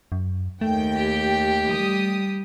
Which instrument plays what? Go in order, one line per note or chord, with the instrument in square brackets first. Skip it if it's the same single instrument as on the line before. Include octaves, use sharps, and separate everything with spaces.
[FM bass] F#2
[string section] D#2 G5 [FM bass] A3
[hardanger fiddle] G4
[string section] G3 D#6